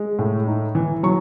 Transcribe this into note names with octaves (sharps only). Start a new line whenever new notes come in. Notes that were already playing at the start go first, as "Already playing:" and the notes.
Already playing: G#3
A2
D#4
E3
F#3 C#6